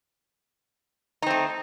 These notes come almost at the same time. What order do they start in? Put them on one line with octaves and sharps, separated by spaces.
D#4 C4 A3